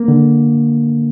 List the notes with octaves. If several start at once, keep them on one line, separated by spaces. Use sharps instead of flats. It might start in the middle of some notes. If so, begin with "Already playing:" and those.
Already playing: A#3
D3